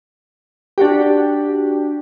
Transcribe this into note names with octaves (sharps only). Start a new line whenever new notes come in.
D4 F#4 G4